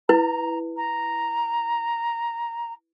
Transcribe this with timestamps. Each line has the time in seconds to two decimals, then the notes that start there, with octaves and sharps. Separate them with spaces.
0.09 E4 B4 A#5
0.77 A#5